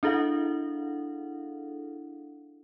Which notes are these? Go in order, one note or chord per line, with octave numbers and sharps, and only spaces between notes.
D4 E4 G#4 A4 F5 F#5